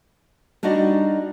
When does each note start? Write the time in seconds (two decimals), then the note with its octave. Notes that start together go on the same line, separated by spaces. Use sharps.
0.63 G3 D4 D#4 F#4 D5 D#5